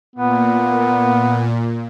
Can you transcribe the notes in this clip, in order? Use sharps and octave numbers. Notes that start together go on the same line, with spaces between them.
A#2 B3